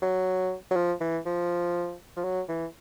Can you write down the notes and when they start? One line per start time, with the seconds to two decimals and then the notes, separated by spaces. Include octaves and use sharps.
0.02 F#3
0.71 F#3
0.76 F3
1.01 E3
1.26 F3
2.17 F3
2.24 F#3
2.49 E3